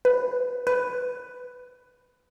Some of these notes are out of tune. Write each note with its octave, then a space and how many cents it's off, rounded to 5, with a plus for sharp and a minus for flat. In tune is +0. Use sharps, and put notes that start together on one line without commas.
B4 +5
B4 +10